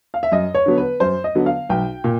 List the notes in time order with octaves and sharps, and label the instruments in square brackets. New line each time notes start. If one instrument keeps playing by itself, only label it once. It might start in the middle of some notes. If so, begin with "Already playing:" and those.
[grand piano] F5
E5
F#2 D#5
C#5
D3 F#3 B3
B4
F#2 C5
D#5
D3 F#3 B3
F5
B1 G5
A#2